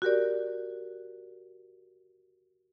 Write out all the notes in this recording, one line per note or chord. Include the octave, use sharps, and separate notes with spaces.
F#4 G4 A#4 D5